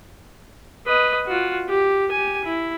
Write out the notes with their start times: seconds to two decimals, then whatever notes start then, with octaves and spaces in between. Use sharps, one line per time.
0.86 B4 D#5
1.27 F4 F#4
1.68 G4
2.11 G4 G#5
2.44 E4